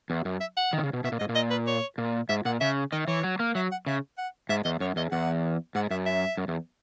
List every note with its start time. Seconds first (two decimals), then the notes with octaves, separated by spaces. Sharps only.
0.10 E2
0.25 F#2
0.41 E5
0.57 F#5
0.73 D#3
0.78 B2
0.83 C#3
0.93 B2
1.04 B2 E5
1.12 A#2
1.19 G#2 D#5
1.29 A#2
1.35 D#5
1.50 B4
1.67 C#5
1.98 A#2
2.29 G#2 E5
2.45 A#2 F#5
2.60 C#3 E5
2.92 D#3 D#5
3.08 E3 C#5
3.24 F#3
3.40 A#3
3.55 F#3 E5
3.71 F#5
3.87 C#3 E5
4.18 F#5
4.49 G#2 E5
4.65 E2 D#5
4.80 F#2 C#5
4.96 E2 D#5
5.11 E2 F#5
5.75 G#2 F#5
5.91 F#2 E5
6.06 E5
6.37 F#2
6.48 E2